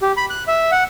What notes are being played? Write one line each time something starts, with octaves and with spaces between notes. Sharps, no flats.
G4
B5
F#6
E5
F#5